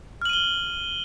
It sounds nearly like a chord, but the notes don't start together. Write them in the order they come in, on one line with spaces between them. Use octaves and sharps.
F6 F#7 D#7 G7